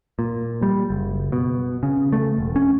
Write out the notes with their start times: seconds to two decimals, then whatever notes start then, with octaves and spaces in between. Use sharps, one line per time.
0.19 A#2
0.62 G3
0.90 F#1
1.32 B2
1.83 C#3
2.13 A3
2.38 E1
2.56 C#4